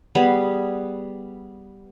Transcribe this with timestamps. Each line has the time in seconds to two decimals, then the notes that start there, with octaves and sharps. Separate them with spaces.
0.15 G3 B3 G#4